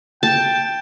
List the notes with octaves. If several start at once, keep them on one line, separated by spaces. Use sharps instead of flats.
G5 A5